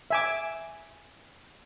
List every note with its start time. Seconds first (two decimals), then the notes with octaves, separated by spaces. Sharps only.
0.11 E5 G#5 D6